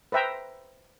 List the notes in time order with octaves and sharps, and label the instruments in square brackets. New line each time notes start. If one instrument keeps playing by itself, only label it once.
[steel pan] B4 C5 E5 G5 A#5